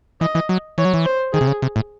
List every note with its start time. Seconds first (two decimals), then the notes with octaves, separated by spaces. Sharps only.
0.21 E3 D#5
0.35 E3
0.49 F#3
0.78 E3 C#5
0.85 F#3
0.94 E3
1.05 C5
1.33 D#3 G#4
1.41 C3
1.47 C#3
1.62 C3
1.76 A2